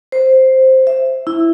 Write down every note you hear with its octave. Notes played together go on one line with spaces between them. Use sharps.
C5
E5
E4